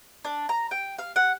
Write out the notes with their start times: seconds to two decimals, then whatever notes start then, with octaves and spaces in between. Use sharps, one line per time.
0.25 D4
0.49 A#5
0.71 G5
0.99 F5
1.16 F#5